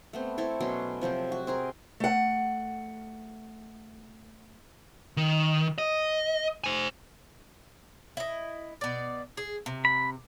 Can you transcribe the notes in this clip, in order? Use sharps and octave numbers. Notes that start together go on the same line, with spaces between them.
A3 B3 C4
C4 E4 A4 C#5
B2 F#3 C#4 C6
C3 F3 F#3 C4
F#4
C4 G#4 A#4
A3 F#5
D#3
D#5
C5 G#5
E4 D#5
B2 D5
G#4
C3
B5